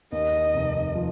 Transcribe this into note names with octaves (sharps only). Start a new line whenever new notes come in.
D#2 D#5
F1
F3